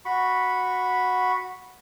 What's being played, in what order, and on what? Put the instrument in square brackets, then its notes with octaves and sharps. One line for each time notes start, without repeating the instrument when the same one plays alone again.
[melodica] F#4 B5 C#6